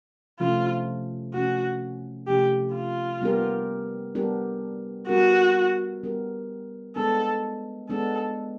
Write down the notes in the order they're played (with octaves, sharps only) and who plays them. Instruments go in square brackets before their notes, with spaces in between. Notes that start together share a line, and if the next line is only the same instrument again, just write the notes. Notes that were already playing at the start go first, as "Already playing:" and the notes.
[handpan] C3 F3 A3 C#4 [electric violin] F4
[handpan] C3 F3 A3 C#4 [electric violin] F#4
[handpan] C3 F3 A3 C#4 [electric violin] G4
[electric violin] F4
[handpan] G3 B3 D4 G4 A#4
G3 B3 D4 G4 A#4
[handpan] G3 B3 D4 G4 A#4 [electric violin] F#4
[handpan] G3 B3 D4 G4 A#4
[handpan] G#3 B3 D4 [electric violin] A4
[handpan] G#3 B3 D4 [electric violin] A4